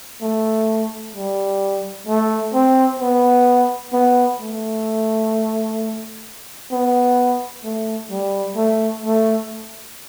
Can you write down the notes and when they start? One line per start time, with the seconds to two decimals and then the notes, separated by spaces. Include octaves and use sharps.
0.22 A3
1.15 G3
2.07 A3
2.53 C4
3.00 B3
3.93 B3
4.40 A3
6.72 B3
7.64 A3
8.10 G3
8.56 A3
9.04 A3